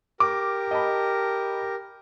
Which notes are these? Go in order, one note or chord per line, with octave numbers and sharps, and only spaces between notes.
G4 A#4 D6
D#5 A5 B5